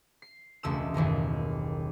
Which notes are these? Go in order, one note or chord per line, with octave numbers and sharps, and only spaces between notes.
C7
E1 C#2 A3 E6 E7
F#1 D#2 B2 D#3